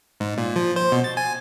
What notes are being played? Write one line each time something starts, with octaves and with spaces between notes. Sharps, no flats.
G#2
A#2
F3
C5
B2
A6
G#5